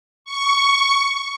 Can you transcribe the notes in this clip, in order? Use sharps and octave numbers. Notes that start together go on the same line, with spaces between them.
C#6